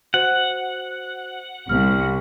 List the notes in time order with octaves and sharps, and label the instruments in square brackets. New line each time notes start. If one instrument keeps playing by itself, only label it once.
[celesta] F#4 C5 [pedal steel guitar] F#5
[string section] C2 [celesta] F6